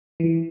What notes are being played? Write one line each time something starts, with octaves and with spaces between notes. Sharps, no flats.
E3